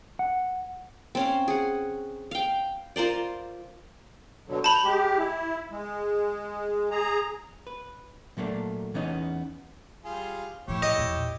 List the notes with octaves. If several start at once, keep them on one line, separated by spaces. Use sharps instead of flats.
F#5
C4 C#4 F5
G#4 F#5
F5 G5
F4 A#4 C5 D5
B2 D3 F#3
A5 B5 G6 F7
G#3 G4
E4
G#3
G#4 A#5
B4
A#2 F#3 A3 A#3 D4
E2 E3 B3 C#4 D#4 D#5
G3 F4 G#4
A2 F3 E4 G4 C#5
D#5
E2 A#2